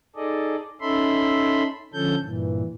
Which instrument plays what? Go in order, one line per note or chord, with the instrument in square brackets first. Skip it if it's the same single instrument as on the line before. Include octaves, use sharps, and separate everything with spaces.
[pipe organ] D#4 G#4 A4 D5 D#5
C#4 D#4 A4 E5 B5 C6
D3 F3 C#4 A4 G6
G2 A#2 E3